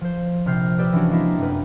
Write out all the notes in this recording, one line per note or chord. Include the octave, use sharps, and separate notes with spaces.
F3 C5
A#1 C3 F6 G6 C7
G4 B4 D5 E6
E3 F3 C#4 D4 F#4
G#3 A#3 C4 E4 F4
F1 F#2 B4